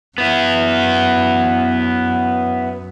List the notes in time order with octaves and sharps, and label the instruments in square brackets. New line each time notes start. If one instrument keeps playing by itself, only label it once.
[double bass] F#2 [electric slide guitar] B3 E4